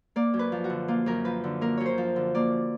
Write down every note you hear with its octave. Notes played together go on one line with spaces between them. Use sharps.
A#3 D5
F#2
B4
F3
F#4
D3
A#3 F4
F#2 A#4
F3 B4
D3
A#3 A#4
F#2 C#5
C5
F3
D3
A#3 D5